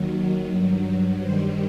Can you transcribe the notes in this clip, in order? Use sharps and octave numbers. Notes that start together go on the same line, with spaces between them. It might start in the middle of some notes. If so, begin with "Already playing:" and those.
Already playing: D#2 D#3 F#3
G2 F#3
G2 D#3 G3 C5